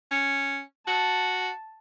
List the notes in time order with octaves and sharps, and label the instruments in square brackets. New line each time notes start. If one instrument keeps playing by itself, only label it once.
[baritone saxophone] C#4
[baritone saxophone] F#4 [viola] A5